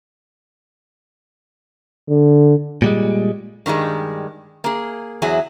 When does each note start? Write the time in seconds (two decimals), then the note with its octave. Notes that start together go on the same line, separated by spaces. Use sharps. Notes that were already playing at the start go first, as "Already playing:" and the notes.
2.09 D3
2.82 A#2 G3 G#3
3.66 G2 D#3 G3 G#3
4.64 A#3 G#4
5.22 E2 F#3 E4 G#4